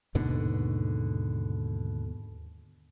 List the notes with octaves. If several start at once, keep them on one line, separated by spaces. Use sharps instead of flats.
D#2 G#2 B2 D3